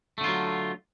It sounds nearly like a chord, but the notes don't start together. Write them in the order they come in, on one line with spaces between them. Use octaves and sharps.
A3 D3 F4 F#3